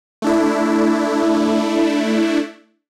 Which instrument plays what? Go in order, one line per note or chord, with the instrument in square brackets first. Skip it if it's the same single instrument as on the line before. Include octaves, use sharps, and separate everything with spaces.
[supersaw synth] A3 D4 E4